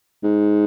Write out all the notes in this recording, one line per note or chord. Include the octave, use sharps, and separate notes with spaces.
G#2